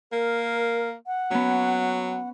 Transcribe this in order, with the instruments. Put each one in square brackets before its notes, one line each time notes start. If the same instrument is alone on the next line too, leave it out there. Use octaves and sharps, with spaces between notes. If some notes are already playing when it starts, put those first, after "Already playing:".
[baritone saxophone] A#3 [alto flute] A#4
[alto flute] F#5
[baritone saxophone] F#3 [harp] B3 C#4